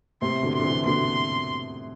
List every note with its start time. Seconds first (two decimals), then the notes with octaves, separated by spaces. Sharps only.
0.22 A2 C3 C6
0.43 B2 D3
0.54 C6
0.59 D3
0.64 C3 E3
0.86 B2 D3 C6